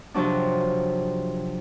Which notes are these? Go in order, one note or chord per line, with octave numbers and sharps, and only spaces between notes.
C3 F3 F#3 D4